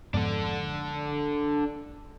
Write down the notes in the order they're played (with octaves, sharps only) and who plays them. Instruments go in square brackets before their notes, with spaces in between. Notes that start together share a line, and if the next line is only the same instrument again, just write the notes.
[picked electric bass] F2 G#2 B3 [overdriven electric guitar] D4 A4